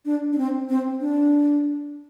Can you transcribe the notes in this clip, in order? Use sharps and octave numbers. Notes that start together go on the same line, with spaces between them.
D4
D4
C4
C4
D4